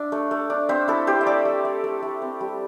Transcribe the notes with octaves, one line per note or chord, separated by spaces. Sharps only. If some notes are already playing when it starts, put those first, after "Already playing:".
Already playing: D4 E5
A3
A3
D4
C4 C5 E5
E4 A4
E4 G4 C5
E5
A3 A4 D5
A3
A3
A3
A3
C4
G3